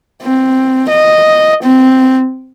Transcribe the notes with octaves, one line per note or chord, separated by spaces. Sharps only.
C4
D#5
C4